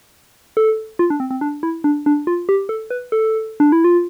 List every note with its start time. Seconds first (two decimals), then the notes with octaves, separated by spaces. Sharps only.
0.57 A4
0.99 F4
1.10 D4
1.20 C4
1.31 C4
1.41 D4
1.63 E4
1.84 D4
2.06 D4
2.27 F4
2.49 G4
2.69 A4
2.90 B4
3.12 A4
3.60 D4
3.72 E4
3.84 F4